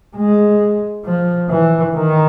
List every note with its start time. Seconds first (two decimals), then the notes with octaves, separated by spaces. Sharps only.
0.17 G#3
1.06 F3
1.50 E3
1.95 D#3